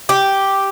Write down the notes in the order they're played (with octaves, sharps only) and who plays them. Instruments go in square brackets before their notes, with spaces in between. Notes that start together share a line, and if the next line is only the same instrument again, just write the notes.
[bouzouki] G4